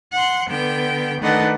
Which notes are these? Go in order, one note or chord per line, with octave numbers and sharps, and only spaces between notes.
F#5 C6
D3 B3 G5
D#3 A3 D4 B4 D#5 F#5